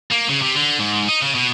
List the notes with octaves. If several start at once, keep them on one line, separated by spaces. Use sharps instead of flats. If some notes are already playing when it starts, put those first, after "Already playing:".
A#3
C#3
C3
D3
G#2
D#4
C#3
B2